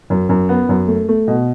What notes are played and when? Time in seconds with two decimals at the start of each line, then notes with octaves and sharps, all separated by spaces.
0.10 F#2
0.29 F#2
0.49 B3
0.69 F#2
0.88 A3
1.08 A3
1.28 B2